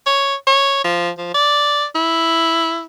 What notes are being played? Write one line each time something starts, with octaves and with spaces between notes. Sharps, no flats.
C#5
C#5
F3
F3
D5
E4